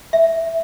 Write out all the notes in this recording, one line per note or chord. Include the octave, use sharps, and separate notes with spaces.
E5